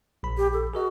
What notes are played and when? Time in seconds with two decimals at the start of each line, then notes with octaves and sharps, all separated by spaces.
0.23 A#1 B5
0.37 G4
0.53 A4
0.74 F#4 G#4 A#4 D#5